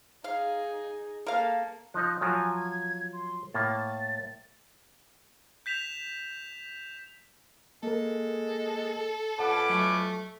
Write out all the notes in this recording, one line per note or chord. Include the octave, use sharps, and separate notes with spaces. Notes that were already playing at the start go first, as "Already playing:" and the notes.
D#4 G#4 F5
A#3 A4 A#4 F5
F3 D#4 F#6
F3 F#3 G#5
G#6
C6
A2 A#3 A6
G6 B6 E7 F7
G#3 A#3 A4 A#4
F2 C#4 B4 F#5 A5 D6
F#3 A3 C#6